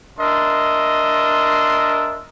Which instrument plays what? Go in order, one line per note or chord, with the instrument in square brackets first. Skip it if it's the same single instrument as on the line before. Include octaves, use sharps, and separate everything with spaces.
[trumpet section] D4 A#4 D#5 E5 C6